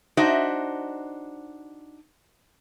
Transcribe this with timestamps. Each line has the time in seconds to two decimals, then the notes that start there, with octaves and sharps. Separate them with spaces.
0.17 D4 D#4 F#4 C5 D#5 E5